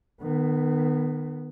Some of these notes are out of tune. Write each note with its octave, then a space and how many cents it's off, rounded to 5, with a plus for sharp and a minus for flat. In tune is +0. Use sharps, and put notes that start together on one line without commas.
D#3 -35 B3 +0